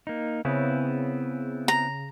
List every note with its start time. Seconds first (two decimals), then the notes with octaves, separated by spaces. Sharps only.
0.07 A#3 D#4
0.45 C#3 B3 C4 E4
1.68 A#5